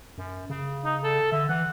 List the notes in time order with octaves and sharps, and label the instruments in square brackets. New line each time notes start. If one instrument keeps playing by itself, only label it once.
[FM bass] F#2
C#3
[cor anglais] D#4
A4
[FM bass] D3 [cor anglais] E5
[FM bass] E3 [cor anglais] F#5